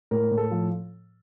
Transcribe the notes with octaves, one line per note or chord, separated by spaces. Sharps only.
A2 A#4
A2
A4
F3